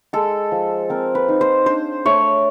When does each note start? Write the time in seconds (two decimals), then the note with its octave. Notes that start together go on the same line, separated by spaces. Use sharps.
0.13 G#3 A4
0.52 F3
0.90 C4 A#4
1.15 B4
1.28 D#4
1.41 C5
1.66 D4 C5
2.06 A3 C#5